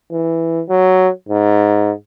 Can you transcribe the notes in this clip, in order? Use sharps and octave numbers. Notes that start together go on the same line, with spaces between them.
E3
F#3
G#2